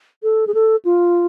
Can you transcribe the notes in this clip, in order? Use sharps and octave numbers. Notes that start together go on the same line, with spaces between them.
A4
G#4
A4
F4